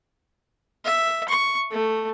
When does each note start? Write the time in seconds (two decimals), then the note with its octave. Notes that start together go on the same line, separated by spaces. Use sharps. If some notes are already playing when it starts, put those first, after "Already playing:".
0.85 E5
1.28 C#6
1.71 A3